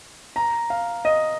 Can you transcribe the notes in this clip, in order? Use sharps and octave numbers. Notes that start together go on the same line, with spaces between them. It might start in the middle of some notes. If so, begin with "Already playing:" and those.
A#5
F5
D#5